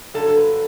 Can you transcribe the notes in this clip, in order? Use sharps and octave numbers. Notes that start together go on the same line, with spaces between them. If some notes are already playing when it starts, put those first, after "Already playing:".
G2 D3 F#3 A4
A4
B4